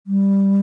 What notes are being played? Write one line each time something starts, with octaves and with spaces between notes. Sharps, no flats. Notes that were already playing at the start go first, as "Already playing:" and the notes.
G3